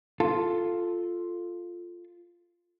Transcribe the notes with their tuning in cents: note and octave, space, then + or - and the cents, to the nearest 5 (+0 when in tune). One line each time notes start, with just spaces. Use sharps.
F4 +0 A4 +0